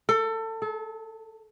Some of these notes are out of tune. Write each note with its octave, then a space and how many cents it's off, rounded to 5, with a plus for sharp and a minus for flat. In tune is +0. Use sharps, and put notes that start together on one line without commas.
A4 +25
A4 -35